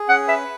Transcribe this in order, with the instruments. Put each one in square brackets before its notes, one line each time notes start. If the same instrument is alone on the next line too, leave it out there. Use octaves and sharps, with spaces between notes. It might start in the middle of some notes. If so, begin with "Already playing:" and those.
Already playing: [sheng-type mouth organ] G#4
[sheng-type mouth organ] C#4 [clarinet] F#5
[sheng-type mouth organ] B4 [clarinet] E5